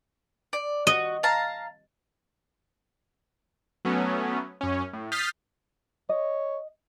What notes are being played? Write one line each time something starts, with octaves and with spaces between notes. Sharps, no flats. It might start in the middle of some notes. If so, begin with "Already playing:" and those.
D5
F#4 D#5
F5 A5 A#5
F#3 A3 B3 C#4
F#2 C#4
A2
D#6 F6 G6 A6 B6 C7
C#5 D#5